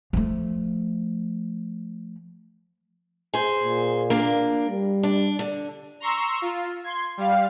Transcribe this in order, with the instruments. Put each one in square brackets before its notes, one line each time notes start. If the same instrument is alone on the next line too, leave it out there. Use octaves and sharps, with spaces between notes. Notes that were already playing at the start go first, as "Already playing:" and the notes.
[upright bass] F3 A3
[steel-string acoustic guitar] G#4 C5
[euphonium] A#2
[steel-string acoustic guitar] A#3 D4
[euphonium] G3
[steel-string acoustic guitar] D4
D3
[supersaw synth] A#5 C6 C#6 E6
F4
C6 G#6
G3 F5